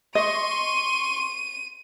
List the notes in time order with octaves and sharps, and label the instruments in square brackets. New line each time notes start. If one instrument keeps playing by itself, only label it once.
[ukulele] D#5 [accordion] C6 C#6 [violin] D#7